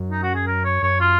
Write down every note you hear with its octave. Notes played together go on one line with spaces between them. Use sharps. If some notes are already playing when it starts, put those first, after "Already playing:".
Already playing: F#2
D#4
F#4
G#4
A#4
C#5
F#2 C#5
F4